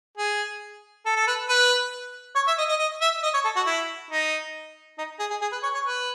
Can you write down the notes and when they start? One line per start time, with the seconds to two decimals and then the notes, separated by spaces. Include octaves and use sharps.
0.18 G#4
1.06 A4
1.16 A4
1.27 B4
1.49 B4
2.35 C#5
2.48 E5
2.58 D#5
2.69 D#5
2.79 D#5
3.01 E5
3.23 D#5
3.34 C#5
3.45 A4
3.56 F#4
3.66 E4
4.11 D#4
4.98 D#4
5.20 G#4
5.30 G#4
5.41 G#4
5.52 B4
5.63 C#5
5.74 C#5
5.85 B4